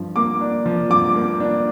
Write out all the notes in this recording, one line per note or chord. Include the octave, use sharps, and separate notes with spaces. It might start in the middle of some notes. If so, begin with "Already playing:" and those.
Already playing: G2 F3
A#3 D6
D4
F3
G2 D6
A#3
D4